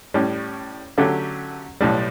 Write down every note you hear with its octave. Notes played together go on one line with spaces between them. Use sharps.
A2 G3 C#4
D3 F#3 A3 C#4 G4
B1 A2 G3